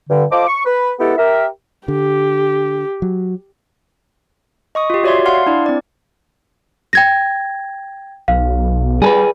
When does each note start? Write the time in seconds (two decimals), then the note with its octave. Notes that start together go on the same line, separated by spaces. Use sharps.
0.09 G2 D3
0.31 F4 A4 C5 D#5 D6
0.48 C#6
0.65 B4
0.99 G#3 B3 E4 G4 A4 F#5
1.17 G4 A#4 E5
1.88 D3 G4
3.02 F#3
4.75 D#5 C#6 D#6
4.90 F4 G4
5.04 F#4 C#5 D5 E5 C6
5.26 F5 F#5 C6 F6
5.46 D4 E4 D5
5.66 C4 D5
6.93 G5 G#6 A#6
8.28 B1 F5
9.02 G3 G#4 A4 B4